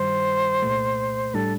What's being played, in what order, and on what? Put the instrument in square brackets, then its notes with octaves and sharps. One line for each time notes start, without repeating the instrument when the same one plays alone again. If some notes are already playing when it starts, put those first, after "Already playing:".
Already playing: [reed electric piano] G2 D#3 G3 [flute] C5
[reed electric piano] C2 A#2 A3
[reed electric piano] A2 G3 D4 [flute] A4